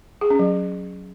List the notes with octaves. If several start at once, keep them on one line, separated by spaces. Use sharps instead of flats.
G#4
C#4
F#3